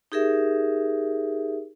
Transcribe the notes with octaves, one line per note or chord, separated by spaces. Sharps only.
D#4 G4 G#4 A#4 E5